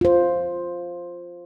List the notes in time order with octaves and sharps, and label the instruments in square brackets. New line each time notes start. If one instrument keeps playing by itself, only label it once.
[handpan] F4 C5